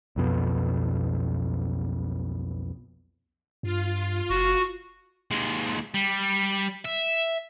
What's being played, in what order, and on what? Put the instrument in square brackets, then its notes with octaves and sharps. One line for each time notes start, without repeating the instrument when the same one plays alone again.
[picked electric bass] B1 F2 B2
[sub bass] G2 [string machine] F4
[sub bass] F#1 [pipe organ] F#4
[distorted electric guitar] D#2 G#3
G3
E5